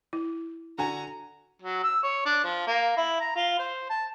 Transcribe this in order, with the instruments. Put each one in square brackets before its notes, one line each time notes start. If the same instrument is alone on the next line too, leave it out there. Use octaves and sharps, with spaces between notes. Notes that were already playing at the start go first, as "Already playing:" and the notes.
[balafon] E4
[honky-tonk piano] D3 F#4 G#5 [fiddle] A#5
[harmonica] F#3
E6
C#5
D4
F3
A#3
E4
A#5
F4
C5
A5